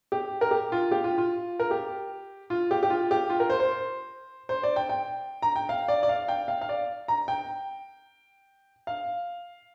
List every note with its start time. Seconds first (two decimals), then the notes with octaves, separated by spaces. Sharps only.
0.12 G4
0.41 A#4
0.51 G4
0.72 F4
0.91 G4
1.04 F4
1.18 F4
1.60 A#4
1.71 G4
2.50 F4
2.71 G4
2.83 G4
2.90 F4
3.11 G4
3.30 F4
3.40 A#4
3.50 C5
3.60 C5
4.49 C5
4.63 D5
4.76 G5
4.89 G5
5.42 A#5
5.56 G5
5.69 F5
5.88 D5
6.03 D5
6.09 F5
6.28 G5
6.48 F5
6.61 F5
6.69 D5
7.08 A#5
7.28 G5
8.87 F5